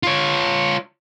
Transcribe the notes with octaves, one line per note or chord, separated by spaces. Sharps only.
F4 C#5